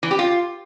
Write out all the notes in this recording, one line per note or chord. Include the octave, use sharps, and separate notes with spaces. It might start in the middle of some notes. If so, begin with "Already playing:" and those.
E3
G4
F4